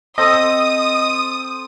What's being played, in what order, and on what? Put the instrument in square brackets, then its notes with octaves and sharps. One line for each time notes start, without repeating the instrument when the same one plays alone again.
[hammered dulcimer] C4 A4 C5 [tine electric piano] D#5 [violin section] D#6